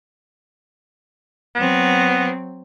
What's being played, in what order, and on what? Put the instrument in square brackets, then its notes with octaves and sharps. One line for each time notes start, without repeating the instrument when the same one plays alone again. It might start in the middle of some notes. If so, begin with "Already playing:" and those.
[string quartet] F#3 C4 [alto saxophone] B3